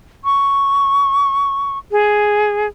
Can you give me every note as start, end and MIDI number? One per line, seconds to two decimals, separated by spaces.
0.24 1.78 85
1.91 2.67 68